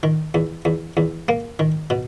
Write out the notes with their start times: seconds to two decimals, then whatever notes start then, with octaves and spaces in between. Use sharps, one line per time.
0.03 D#3
0.34 E2
0.65 E2
0.97 E2
1.28 A#3
1.59 D#3
1.90 B2